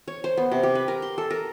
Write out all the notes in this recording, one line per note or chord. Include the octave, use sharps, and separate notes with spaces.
C#5
C5
B3
C3
G4
B4
A#4
C6
A4
A#4